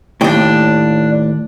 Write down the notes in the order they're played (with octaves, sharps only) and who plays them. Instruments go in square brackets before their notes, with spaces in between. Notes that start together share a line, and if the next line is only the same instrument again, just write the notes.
[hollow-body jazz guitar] D#2 A2 [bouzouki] D4 G5